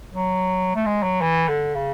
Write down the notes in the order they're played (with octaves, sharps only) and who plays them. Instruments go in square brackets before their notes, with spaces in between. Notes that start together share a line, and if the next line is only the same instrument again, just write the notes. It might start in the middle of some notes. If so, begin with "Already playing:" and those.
[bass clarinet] F#3
A3
G#3
F#3
E3
D3
C#3